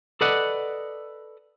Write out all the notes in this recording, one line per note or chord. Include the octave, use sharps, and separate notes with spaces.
A4 B4 D5 D#5 F#5